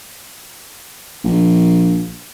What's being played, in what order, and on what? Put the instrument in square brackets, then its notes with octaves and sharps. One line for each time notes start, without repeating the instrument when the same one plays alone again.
[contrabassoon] A#1